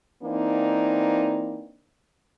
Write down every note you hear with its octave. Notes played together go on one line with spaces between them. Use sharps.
E3 A#3 C4 D4 D#4